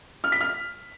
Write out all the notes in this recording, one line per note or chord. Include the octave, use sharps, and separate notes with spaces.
F6
B6
F6